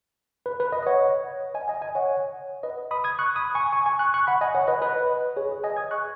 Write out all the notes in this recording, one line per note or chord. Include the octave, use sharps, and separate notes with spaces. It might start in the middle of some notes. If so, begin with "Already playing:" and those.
B4
B4
B4 D#5
D#5
C#5 F#5
D#5 G#5
D#5 G#5
D#5 G#5
C#5 F#5
B4 D#5
B5 D#6
D#6 G#6
C#6 F#6
B5 D#6
G#5 C#6
G#5 C#6
G#5 C#6
C#6 F#6
C#6 F#6
F#5 B5
D#5 G#5
C#5 F#5
B4 D#5
B4 D#5
G#4 C#5
G#4
D#5 G#5
D#6 G#6
C#6 F#6